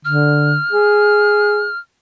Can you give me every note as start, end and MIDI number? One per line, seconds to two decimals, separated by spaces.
0.05 0.57 50
0.05 1.78 89
0.72 1.68 68